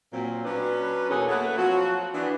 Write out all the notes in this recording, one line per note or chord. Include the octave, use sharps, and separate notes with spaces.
A#2 F#3 C4
F#3 C#4 D4 B4
E2 B2 A#3 G#4 A4 C#5
A3 A#3 A4 B4 C#5 F#5
F3 F#3 C4 F#4
E3 B3 D4